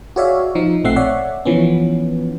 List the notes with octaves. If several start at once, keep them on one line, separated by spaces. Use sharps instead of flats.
F#4 G#4 C#5 D5 E5 F5
F3 D#4
A#1 A3 C4 E5 F#5 C7
C#5 D5 E5 F#5
E3 F3 B3 C#4